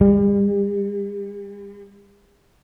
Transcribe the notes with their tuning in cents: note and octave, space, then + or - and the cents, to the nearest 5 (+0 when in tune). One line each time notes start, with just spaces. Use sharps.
G3 +45